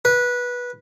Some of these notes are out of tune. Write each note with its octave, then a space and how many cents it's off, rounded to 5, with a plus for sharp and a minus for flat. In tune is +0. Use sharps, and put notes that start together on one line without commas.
B4 -15